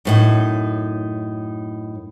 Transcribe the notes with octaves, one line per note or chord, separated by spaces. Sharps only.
F#2 A2 D#4